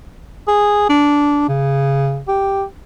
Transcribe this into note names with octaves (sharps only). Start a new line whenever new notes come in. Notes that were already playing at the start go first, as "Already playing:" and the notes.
G#4
D4
C#3
G4